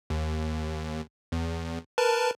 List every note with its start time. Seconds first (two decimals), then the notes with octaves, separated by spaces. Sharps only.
0.10 D#2
1.32 E2
1.98 A#4 B4 A5